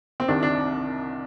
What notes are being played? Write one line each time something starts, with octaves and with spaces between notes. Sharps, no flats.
C4
C2 C3 D#3 D4
D4